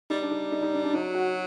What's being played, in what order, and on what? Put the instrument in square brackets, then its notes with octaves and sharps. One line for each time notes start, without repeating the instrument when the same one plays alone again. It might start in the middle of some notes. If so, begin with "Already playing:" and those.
[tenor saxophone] G3 [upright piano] D#4
[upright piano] D4
D#4
D#4
D#4
D4
D4
[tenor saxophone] F#3 [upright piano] D#4
[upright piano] F#4